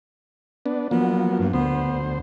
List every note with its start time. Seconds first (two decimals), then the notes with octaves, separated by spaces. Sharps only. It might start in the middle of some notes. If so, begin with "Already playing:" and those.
0.66 B3 D4
0.91 F3 F#3 A#3 B3
1.39 G2
1.53 D2 B3 C5